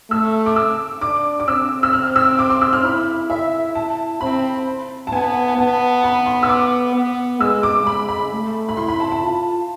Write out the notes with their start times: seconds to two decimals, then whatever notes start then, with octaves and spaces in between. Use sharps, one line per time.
0.10 A3 E6
0.46 D6
0.56 E6
1.01 D4 D6
1.40 D6
1.48 C4 E6
1.83 E6
1.93 F6
2.16 E6
2.39 D6
2.50 C6
2.62 E6
2.73 F6
2.84 E4 B5
3.30 E5
3.75 A5
4.21 C4 B5
5.07 A5
5.13 B3 G#5
5.57 B3 A5
6.04 B5
6.26 C6
6.43 E6
6.49 D6
6.95 B3
7.40 G#3 E6
7.63 D6
7.86 G#3 B5
8.09 B5
8.32 A3
8.69 B5
8.77 E4 C6
8.88 B5
9.00 A5
9.12 A5
9.23 F4